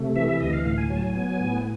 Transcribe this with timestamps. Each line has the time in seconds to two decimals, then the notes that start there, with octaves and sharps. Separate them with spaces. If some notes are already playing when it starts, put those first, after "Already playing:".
Already playing: C3 A3
0.16 E3 E5
0.29 E5
0.40 D2 D#5
0.53 F5
0.65 A2 F5
0.78 G#5
0.90 F#3 G#5
0.97 A5
1.02 G#5
1.15 B3
1.39 A2